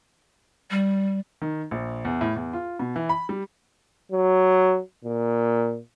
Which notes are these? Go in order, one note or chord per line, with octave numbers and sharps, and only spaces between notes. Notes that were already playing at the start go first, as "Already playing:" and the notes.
G3
D#3
A#1
E2
A2
E2
F4
B2
E3
B5
G3
F#3
A#2